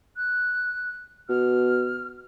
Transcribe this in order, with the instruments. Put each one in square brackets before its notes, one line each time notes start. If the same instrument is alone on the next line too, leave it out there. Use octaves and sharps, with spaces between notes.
[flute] F#6
[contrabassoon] B2 [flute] F6